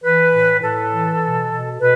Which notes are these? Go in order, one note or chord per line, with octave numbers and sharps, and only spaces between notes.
E3 B4
A2
A2 A4
E3
B2
B2
B2 B4